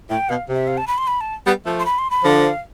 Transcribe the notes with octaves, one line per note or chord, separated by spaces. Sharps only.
A2 G5
B2 F5
C3
E5
F5
A5
B5
C6
B5
A5
G3 B3
F3 A3
C6
B5
C6
B5
D3 F3
F5